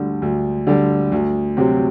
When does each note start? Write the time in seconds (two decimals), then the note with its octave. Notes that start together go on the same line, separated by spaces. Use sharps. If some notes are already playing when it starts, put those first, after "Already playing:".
Already playing: D2 D3 G3
0.22 D2
0.67 D3 G3
1.12 D2
1.57 C3 F#3 C4